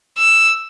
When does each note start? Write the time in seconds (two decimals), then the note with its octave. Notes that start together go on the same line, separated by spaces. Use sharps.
0.18 E6